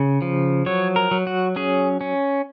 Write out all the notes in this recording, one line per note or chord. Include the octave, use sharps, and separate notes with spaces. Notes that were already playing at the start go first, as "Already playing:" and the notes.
Already playing: C#3
F3
F#3 C#5
A#4
F#3
F#4
C#4 G#4
C#4